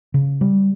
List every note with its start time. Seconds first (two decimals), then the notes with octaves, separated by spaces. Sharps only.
0.14 C#3
0.41 G3